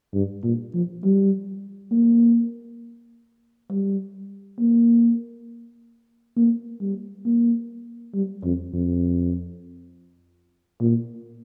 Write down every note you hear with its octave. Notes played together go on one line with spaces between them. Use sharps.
G2
A#2
F3
G3
A#3
G3
A#3
A#3
G3
A#3
G3
F2
F2
A#2